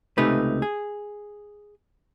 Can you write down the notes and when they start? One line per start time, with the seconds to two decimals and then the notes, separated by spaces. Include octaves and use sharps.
0.18 C#2 C3 A3 D#4 B4
0.62 G#4